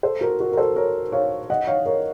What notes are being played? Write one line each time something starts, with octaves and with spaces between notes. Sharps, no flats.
A4 C5
F#4 A#4
F#4 A#4
A#4
A4 C5
A#4 C#5
C#5 F5
D#5 F#5
C#5 F5
A#4 C#5